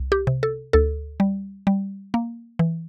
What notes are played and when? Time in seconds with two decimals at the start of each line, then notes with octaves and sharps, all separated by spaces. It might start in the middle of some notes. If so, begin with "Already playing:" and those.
Already playing: C2
0.12 G4
0.27 C3
0.43 A4
0.73 D2 A4
1.20 G3
1.67 G3
2.14 A#3
2.59 E3